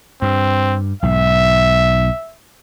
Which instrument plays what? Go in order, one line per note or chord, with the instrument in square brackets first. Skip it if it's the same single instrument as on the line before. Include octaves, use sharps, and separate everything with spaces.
[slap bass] G2 [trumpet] C4
[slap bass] B1 G#2 [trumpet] E5